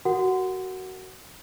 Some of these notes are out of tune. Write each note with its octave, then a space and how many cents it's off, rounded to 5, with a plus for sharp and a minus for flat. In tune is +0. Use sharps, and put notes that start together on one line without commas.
F#4 +15 A#4 -15 F#5 +0